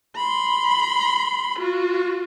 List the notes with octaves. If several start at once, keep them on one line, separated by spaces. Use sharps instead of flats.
B5 C6
F4 F#4